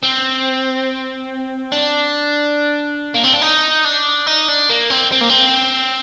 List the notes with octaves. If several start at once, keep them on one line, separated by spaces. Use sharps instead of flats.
C4
D4
A#3
C4
D4
D#4
D4
D#4
D4
A#3
C4
C4
A#3
C4